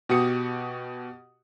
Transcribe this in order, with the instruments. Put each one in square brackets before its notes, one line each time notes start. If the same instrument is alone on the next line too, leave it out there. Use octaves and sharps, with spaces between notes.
[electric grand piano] B2 F#4 G4 D#6 C#7